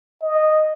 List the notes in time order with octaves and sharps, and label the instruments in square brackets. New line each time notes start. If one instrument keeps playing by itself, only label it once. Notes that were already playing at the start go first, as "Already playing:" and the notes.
[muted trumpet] D#5